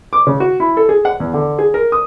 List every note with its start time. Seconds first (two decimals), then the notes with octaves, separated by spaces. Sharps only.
0.13 D6
0.27 C#3
0.40 F#4
0.60 E4
0.77 A4
0.89 G#4
1.05 F#5
1.20 E2
1.34 D3
1.59 G#4
1.74 A#4
1.92 D#6